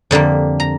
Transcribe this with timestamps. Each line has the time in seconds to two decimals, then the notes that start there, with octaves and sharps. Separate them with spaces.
0.11 F2 D3 G3 A#3
0.60 A#5